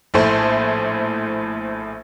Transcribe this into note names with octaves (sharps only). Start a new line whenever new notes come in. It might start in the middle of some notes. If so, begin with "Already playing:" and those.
A#1 A2 A3 C5